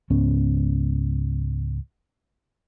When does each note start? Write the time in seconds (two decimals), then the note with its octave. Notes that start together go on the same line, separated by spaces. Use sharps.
0.10 C#2 G#2 B3 C#4